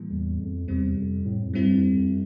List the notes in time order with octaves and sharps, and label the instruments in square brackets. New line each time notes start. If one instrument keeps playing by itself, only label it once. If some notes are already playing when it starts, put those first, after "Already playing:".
Already playing: [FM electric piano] A2 E3 G3 A#3
[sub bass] E2
F2
[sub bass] E2 [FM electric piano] C3 G3 C4
[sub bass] F2
A2
F2
[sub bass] G2 [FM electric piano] G3 C4 E4
[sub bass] F2
F2